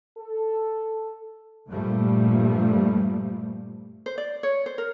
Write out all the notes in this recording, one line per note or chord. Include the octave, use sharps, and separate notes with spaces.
A4
G2 A#2 F3 G3 A3 A#3
C5
D5
C#5
C5
A#4